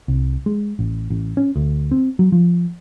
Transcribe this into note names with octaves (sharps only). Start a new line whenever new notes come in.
C2
G#3
A1
A1
C#4
D2
C4
F#3
F3